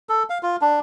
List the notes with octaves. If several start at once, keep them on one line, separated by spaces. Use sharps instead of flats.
A4
F5
F4
D4